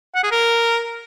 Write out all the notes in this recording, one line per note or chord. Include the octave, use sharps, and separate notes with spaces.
F#5
G#4
A#4